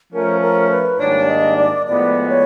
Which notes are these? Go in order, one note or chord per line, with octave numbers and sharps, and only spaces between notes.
F3 A3 C#4 A#4
A#4
B4
G#2 D#3 G3 A#3 D4 C#5
D#5
D5
A2 F3 G#3 B3 D5
C#5